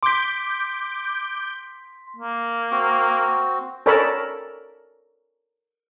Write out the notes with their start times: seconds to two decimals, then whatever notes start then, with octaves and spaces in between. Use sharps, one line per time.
0.03 C6 D6 G6 B6
2.16 A#3
2.71 C4 F#4
3.86 A4 A#4 C#5 D5 A5 B5